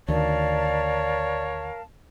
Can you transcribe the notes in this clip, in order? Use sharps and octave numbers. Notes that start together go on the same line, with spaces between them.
D2 D#3 A#4 C#5 D5 F5 A5